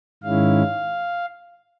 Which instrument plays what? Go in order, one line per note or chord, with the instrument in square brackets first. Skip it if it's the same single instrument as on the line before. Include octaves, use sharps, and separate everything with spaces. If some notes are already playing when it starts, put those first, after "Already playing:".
[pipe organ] G#2 D#3 G#3 C#4 E4 F5